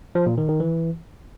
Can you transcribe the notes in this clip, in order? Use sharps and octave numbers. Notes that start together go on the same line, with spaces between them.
F3
A#2
D#3
D#3
E3